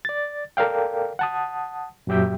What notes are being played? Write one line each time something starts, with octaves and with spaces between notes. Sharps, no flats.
D5 A6
A4 A#4 D5 F5 G5
F#5 A5 D#6
F#2 A#2 F#3 G4 E5 G5